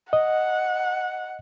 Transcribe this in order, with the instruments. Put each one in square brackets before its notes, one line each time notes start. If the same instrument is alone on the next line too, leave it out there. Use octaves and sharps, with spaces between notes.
[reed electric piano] D#5 [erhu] F#5